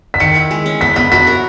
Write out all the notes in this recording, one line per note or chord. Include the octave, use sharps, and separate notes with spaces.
B6
D#3 C#7
E4
G#3
C#4
B3 B6
B3 B6
F#4 B6
A#4